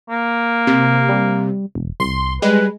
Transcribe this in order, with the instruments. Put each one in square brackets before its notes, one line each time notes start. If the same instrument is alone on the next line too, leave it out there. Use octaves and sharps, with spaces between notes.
[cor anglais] A#3
[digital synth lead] C3
[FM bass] G3
E1
[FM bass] C2 [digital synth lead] C6
[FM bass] G3 [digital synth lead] G#3 [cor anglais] B4